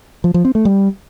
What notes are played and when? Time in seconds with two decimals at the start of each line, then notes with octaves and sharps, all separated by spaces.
0.24 F3
0.34 F3
0.45 C4
0.55 A3
0.65 G3